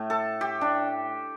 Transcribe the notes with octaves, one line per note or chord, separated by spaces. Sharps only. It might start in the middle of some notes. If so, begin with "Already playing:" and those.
Already playing: A2 A3
A4
G4
D4